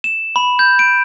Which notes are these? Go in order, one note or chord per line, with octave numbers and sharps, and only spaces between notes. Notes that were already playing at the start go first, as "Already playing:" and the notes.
E7
B5
G6
D7